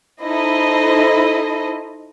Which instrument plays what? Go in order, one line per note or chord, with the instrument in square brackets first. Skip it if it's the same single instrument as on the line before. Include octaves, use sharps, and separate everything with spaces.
[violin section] D#4 E4 A4 C5 D#5